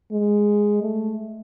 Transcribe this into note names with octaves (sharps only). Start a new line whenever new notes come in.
G#3
A3